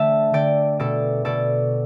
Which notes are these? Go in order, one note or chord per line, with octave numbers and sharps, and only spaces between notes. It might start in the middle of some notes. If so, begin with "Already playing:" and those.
Already playing: D3 A3 E5 G5 A5
D3 D5 G5
B2 A4 D5
B2 A4 D5